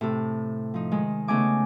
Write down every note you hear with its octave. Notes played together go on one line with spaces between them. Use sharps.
A2 C3 A4
F3 D#4
D#3 G#3
C#3 A3 B3 D#4 G#5 D6